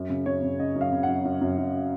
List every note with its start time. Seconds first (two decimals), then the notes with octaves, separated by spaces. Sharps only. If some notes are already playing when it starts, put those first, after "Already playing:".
Already playing: F#2
0.10 C#3
0.26 F#2 C#5
0.43 C#3
0.59 C#3 D#5
0.75 F#2
0.81 F5
0.92 C#3
1.03 F#5
1.09 F#2
1.25 F#2
1.41 F#2
1.58 F#2